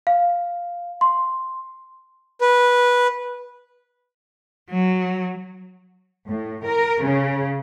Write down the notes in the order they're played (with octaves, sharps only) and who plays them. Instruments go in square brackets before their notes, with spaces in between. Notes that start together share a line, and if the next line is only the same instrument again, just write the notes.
[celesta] F5
C6
[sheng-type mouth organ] B4
[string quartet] F#3
[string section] A2
A#4
C#3